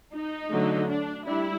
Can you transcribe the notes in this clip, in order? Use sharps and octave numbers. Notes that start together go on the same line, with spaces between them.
D#4
D3 F#3 A3
D4
G3 D4 E4